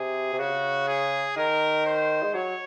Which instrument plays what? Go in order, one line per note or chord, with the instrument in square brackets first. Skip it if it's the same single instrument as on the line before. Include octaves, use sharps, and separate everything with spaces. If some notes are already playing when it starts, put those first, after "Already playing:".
Already playing: [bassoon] C3 [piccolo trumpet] G#4
[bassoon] C3
[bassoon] C#3 [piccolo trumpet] F#4
[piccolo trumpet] G#4
[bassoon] D#3 [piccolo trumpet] A#4
[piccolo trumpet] C5
[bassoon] G#3
[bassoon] F#3 [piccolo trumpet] C#5